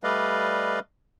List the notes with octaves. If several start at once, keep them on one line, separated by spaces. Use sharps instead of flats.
G3 A3 B4 D5 D#5 F5